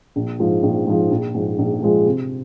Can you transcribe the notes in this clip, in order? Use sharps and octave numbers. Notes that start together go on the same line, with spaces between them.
A#1
G#2 F3
A#1
G#2 F3
A#1
G#2 F3 G#3
A#1
G#2 F3 G#3
C3